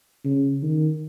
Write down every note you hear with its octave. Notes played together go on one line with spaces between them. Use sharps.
C#3
D#3